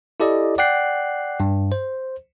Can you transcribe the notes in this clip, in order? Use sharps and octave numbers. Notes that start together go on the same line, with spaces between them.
E4 G4 A4 D5 D#5
D5 F#5 G5 F#6 C7
G2
C5